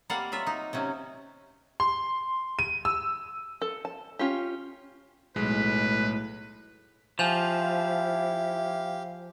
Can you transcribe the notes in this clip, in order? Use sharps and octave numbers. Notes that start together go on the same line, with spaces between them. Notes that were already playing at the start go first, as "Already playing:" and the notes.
G3 A#3 C4 D5 F5 F#5
F#3 F4 E5
D#4
C3 F#3 C#4
C6
D#7
E6
A4
A5
C#4 F4 G4
B1 A2 G#3 B4
F3 E4 G4 F5 G#5 G6 F7